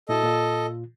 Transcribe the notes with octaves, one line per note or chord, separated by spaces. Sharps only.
A#2 E4 F#4 A4 D#5
A#2 F4